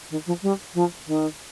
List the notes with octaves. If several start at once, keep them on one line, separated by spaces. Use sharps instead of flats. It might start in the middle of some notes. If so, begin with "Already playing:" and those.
D#3
F3
G3
F3
D#3